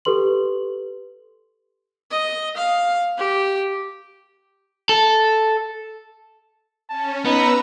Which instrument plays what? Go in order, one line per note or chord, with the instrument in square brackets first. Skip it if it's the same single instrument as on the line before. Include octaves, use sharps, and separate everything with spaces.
[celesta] G4 A4 B4 C6 F#7
[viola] D#5
F5
G4
[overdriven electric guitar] A4
[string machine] C#4 [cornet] A5
[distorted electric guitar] B3 [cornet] D#4 [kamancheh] B4 [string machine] A#5 E6